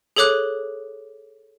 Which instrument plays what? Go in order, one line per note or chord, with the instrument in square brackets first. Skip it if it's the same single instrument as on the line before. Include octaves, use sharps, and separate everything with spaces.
[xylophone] G#4 A4 C#5 D6 F#6 F#7